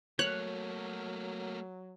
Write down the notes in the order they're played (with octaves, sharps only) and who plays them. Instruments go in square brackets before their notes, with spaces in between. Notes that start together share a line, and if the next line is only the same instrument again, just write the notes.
[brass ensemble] F#3 [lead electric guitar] A3 A#3 [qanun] C#5 [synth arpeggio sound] F#6